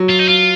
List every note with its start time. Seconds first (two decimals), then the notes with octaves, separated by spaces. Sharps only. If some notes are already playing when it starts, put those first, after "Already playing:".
Already playing: F#3
0.09 F4
0.19 D#4
0.28 F4